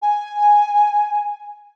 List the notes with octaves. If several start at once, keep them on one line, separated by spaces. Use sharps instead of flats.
G#5